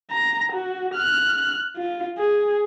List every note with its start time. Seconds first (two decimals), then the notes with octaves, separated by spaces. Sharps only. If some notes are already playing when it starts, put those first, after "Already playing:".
0.11 A#5
0.53 F#4
0.95 F6 F#6
1.77 F4
2.18 G#4